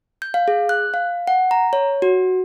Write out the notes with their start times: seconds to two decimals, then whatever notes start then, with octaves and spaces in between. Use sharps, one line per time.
0.22 G6
0.34 F5
0.48 G#4
0.69 F#6
0.94 F5
1.28 F#5
1.51 A#5
1.73 C#5
2.02 F#4